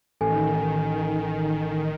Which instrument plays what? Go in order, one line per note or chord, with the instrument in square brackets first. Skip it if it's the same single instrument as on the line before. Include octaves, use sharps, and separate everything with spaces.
[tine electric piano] A1 [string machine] D#3 [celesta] A4 G#5